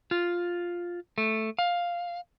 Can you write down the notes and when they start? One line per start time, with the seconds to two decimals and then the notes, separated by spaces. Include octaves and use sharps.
0.11 F4
1.18 A3
1.59 F5